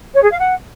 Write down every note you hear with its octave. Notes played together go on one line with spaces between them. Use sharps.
C#5
G#4
F5
F#5